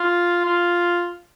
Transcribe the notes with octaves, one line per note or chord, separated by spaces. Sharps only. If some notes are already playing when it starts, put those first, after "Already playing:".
Already playing: F4
F4